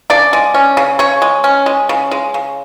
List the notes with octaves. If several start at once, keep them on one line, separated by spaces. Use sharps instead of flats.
C#3 D4 D5
G#3
C#4
C#3
C#3 C#4 C#5
G#3
C#4
G#3
C#3
G#3
C#3